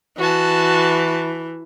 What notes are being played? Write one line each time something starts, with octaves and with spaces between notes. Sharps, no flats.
E3 F#4 A5